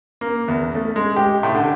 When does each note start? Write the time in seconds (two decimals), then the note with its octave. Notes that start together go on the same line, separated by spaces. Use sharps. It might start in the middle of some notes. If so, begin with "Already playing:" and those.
0.21 A#3
0.48 E2
0.75 A3
0.96 G#3
1.16 G4
1.43 A2
1.55 D3